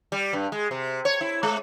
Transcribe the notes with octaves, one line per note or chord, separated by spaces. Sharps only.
G3
G2
G#3
C3
C#5
E4
G#3